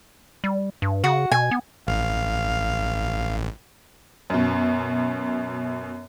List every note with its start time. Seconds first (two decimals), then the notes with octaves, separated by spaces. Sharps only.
0.44 G3
0.82 G2
1.04 C#3 F#4 F#5
1.32 B2 G#5
1.51 B3
1.87 A1 F5
4.30 F#2 B2